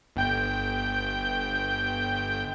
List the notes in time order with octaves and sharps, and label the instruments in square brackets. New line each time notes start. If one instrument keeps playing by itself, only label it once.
[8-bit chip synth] G1 G5 G6